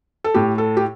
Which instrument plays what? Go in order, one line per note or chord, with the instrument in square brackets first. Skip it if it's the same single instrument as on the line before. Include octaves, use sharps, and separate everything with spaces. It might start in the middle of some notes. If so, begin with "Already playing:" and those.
[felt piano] A4
A2 G4
A4
G4